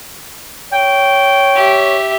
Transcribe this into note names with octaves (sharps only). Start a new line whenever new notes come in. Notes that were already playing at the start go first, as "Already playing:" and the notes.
C#5 G5
G4 E5